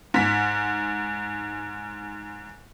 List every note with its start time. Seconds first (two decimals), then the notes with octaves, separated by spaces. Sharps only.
0.14 G#2 B6